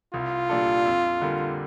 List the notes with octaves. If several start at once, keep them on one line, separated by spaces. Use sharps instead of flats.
C2 F4
A#2 G3 D4 A4
F2
D3 G3 A#3